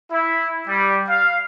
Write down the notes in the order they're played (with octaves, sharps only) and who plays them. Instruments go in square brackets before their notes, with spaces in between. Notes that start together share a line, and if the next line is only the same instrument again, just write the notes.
[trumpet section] E4
G3
F5